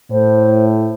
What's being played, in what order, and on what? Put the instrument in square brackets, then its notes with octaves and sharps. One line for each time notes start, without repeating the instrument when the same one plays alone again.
[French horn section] A2 [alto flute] C5